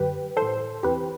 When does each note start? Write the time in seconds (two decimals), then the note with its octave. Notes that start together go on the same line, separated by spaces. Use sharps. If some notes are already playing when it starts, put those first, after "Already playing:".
Already playing: F#2 D3 F#3 G4 B4
0.37 A2 E3 A4 C5
0.83 E2 C3 E3 G4 B4